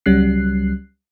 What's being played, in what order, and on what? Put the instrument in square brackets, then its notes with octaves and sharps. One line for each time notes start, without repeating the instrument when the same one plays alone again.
[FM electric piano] C#2 F#3 G3 C#4 F#6 C7